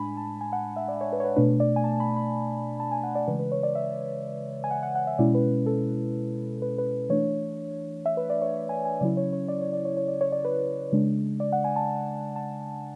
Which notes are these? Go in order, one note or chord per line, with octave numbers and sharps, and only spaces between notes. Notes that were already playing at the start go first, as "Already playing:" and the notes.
Already playing: A2 G#3 D4 G#5 B5
A5
G#5
F#5
E5
D5
C#5
B4
C#5
B4
B2 A3 D4 B4
D5
G#5
A5
B5
B5
A5
G#5
F#5
D5
C#3 E3 G#3 B4
B4
C#5
D5
E5
G#5
F#5
F#5
F#5
E5
B2 G#3 C#4 E4 D5
B4
A4
B4
B4
E3 A3 D4 C#5
E5
B4
D5
C#5
C#5
G#5
G#5
C#3 F#3 C#4 E4 D5
C#5
C#5
D5
C#5
D5
C#5
C#5
D5
C#5
D5
B4
C#3 G#3 D4
D5
F#5
G#5
A5
A5